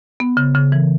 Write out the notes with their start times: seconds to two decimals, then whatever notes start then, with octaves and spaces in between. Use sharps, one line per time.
0.20 B3
0.37 C#3
0.55 C#3
0.72 E3